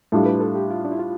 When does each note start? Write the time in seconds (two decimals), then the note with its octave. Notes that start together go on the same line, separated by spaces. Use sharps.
0.12 A2 G3 D4 F4 A4
0.26 B4
0.40 A4
0.55 G4
0.70 F4
0.85 D4
0.92 E4
0.99 F4